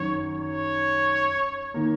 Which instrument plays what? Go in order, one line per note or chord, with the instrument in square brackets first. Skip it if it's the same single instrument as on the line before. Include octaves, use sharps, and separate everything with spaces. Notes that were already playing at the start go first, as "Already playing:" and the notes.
Already playing: [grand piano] F#2 D#3 F#3 C#4 [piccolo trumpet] C#5
[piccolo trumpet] C#5
[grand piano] D#3 A#3